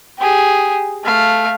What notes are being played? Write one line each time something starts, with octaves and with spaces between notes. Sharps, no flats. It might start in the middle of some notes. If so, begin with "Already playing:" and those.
G4 G#4
A3 F5